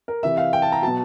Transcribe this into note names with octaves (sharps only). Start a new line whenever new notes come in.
A#4
C3 E3 E5
F5
G5
A5
A#5
B2 F#3 A5